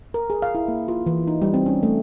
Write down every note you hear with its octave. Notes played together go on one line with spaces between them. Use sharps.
A#4
G#4
F5
E4
A#3
F4
E3
D#4
G3
C4
C#4
A3